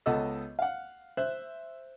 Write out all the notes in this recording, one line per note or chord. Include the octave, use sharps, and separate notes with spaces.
C#2 B3 A4 D#5 E6
F5 F#5
C5 E5 F#6